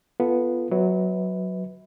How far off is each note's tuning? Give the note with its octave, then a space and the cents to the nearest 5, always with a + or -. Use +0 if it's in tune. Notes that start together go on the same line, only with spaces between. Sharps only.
B3 +0 F4 -15 A4 +0
F#3 +0 B4 +10 E5 -40